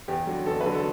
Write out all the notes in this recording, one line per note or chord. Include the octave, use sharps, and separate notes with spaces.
E2 G4
D3 F#3
E2 A4
B4
D3 F#3
A4